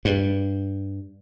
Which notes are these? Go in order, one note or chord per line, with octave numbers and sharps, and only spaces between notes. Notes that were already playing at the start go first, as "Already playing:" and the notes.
G2